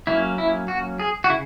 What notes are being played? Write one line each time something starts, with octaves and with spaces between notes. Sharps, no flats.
F#3 A#3 C#4 E4
E4
F#4
G#4
F#4
C#3 E4